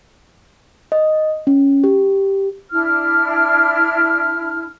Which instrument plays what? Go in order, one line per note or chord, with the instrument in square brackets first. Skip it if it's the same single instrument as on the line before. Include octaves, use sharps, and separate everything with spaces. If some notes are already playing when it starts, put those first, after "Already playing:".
[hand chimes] D#5
C#4
G4
[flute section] D4 E4 F6